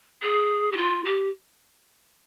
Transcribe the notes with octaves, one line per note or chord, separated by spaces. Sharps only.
G#4
G4
F4
G4